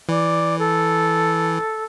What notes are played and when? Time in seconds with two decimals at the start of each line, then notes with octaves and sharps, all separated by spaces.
0.09 E3 D5
0.59 A4